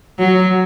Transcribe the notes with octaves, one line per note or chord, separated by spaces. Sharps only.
F#3